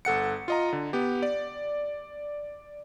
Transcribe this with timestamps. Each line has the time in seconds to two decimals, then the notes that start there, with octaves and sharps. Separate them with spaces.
0.05 G1 A4 F#5 C#7
0.48 F4 D#5 A#5
0.73 D3
0.93 B3 G4
1.23 D5